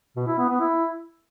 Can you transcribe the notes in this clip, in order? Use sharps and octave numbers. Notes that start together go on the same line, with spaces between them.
B2
E4
B3
B3
E4